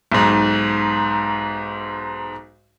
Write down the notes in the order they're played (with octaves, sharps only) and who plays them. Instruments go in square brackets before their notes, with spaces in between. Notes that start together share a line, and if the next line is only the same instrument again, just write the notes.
[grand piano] B1 G#2